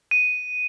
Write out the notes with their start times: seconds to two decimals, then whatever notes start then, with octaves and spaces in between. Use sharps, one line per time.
0.11 D#7